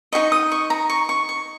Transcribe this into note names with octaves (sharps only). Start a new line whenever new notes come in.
D#4 G#4 D#5 C#6
D#6
C#6
A#5
C#6
C#6
C#6